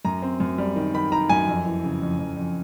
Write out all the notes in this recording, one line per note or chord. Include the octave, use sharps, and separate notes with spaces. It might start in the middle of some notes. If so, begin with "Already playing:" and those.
F#2 A#5
C4
F#2
G3
D#3
D#3 B5
D#3 A#5
F#2 G#5
F2
E3
C#3
F2
F2
F2